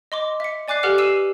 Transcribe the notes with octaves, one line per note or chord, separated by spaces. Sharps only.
D#5 C6 D6
E5 C#7
D5 G#5 D6 F#6 C7
G4 A4 B4 F#5 D6 F6
E6 C7 D#7 E7